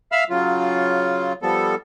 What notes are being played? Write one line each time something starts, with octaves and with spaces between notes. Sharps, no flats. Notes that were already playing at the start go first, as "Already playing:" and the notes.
E5 F5 B5 E6 F6
C#3 F#3 F4
F3 G3 B3 A4